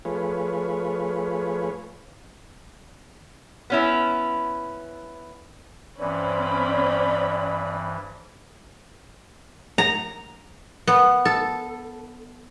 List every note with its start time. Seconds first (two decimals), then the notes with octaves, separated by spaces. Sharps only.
0.05 F3 A3 F4 G#4 B4 C#5
3.70 B3 C#4 E4
5.99 G2 E3 C4 C#4 D5 B5
9.78 A#5
10.87 B3
11.25 A4